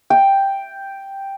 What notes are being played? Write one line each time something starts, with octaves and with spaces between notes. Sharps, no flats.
G5